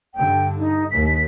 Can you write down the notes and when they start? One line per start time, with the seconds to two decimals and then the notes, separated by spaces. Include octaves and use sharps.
0.15 G2 D3 G5
0.58 D#4
0.91 D#2 B6